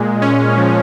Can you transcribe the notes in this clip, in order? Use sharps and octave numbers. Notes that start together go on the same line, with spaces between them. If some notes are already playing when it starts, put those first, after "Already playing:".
Already playing: A#2 G#3
C#4
F3